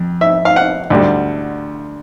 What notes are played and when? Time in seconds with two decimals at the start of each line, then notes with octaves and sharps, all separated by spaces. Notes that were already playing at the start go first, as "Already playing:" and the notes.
Already playing: F2
0.21 E5
0.45 F5
0.56 F#5
0.90 D2 D3 G3